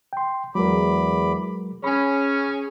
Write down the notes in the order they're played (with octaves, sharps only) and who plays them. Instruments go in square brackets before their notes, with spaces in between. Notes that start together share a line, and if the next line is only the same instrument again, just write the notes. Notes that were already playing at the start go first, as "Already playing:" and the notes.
[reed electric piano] G5 C6
[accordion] E2 B5 D6 [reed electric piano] F#3 G#3 A#4
[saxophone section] C#4 [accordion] G#4 [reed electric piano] B5